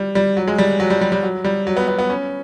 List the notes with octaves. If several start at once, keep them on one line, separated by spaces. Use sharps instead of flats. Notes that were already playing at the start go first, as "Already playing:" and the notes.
Already playing: G3
G3
F#3
G#3
G3
F#3
G3
G3
G3
F#3
G3
F#3
B3
B3
B3
C#4